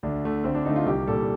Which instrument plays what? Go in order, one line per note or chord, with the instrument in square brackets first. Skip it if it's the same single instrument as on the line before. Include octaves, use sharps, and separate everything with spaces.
[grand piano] D2 D4
D3 A3
D2 C4
D4
D3 A3 D#4
F4
C2 G4
A#2 G3 A4